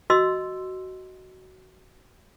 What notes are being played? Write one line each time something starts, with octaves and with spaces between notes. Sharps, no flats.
F#4 D#5 C6 E6